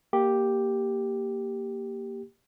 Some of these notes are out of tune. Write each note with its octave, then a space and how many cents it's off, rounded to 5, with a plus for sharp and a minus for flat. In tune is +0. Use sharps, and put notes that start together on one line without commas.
A#3 +0 G4 +0